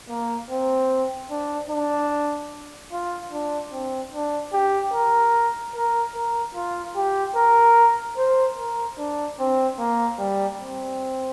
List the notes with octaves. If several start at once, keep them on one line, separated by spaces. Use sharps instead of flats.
A#3
C4
D4
D4
F4
D4
C4
D4
G4
A#4
A#4
A#4
F4
G4
A#4
C5
A#4
D4
C4
A#3
G3
C4